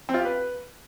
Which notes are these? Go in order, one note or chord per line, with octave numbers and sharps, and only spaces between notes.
C4
F4
G4
B4